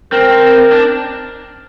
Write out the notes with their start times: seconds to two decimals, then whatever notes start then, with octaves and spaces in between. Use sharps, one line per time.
0.12 C4 A#4
0.72 D4